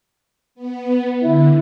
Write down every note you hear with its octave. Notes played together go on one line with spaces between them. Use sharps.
B3
D3 E4